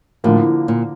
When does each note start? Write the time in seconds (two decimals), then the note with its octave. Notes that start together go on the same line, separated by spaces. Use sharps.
0.24 A2 D3 F3 A#3
0.68 A#2